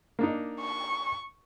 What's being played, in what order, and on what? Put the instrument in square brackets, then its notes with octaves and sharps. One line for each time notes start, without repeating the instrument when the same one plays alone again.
[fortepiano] A#3 D4 D#4
[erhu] C#6